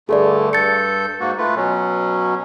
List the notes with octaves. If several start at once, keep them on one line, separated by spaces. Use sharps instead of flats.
G2 D3 A3 G#4 A4 D5
G2 A4 G6 A6 C#7
G#2 A#3 F#4
A3 F4 B4
B2 F#3 C#4